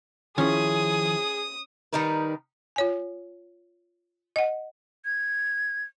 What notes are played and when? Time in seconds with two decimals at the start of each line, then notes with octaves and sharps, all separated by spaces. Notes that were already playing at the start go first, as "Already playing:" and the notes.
0.38 D#3 F3 C#4 E4 G#4 D#6
1.93 D#3 G3 D#4 A#4 B4
2.76 F4 C#5 G#5
4.36 D#5 F#5
5.05 G#6